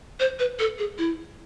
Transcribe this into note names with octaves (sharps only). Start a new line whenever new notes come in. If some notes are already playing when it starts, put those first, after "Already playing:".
C5
B4
A4
G#4
E4